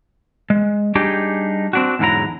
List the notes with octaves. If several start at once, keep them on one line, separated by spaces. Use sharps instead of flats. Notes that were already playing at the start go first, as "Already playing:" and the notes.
G#3
G3 D4 D#4 G4 G#4
C4 D4 F#4
E2 G#2 D3 F#3 E4 A#5